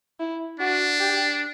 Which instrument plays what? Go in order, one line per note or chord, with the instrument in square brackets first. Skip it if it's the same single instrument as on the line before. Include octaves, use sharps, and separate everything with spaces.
[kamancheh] E4
[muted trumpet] D4 [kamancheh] F#4
[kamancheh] G4